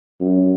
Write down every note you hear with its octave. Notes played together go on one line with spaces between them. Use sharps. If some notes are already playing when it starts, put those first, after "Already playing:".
F#2